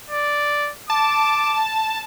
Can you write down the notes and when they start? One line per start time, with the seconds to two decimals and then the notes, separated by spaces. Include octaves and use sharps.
0.11 D5
0.90 A5 D6